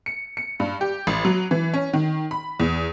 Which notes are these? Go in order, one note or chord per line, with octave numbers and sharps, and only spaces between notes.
C#7
C#7
G2
G4
A1
F#3
E3
C#4
D#3
B5
E2